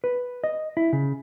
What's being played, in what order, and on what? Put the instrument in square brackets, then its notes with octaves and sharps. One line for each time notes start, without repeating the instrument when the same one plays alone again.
[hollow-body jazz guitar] B4
D#5
E4
C#3